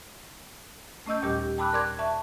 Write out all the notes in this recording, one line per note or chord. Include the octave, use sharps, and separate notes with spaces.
A3 C#4 D#5 E6 G6
D#2 A#2 G3 G4
G5 A5 B5 D6 E6 F#6
A#4 D5 C6 D6 F#6 G#6
E5 A5 C#6